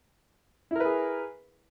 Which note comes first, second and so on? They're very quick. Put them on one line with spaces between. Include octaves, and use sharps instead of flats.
E4 A#4 B4 G#4